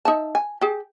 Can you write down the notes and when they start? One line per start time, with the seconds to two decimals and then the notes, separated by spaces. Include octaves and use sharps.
0.05 D#4 E5 A5
0.35 G#5
0.61 G4 G#4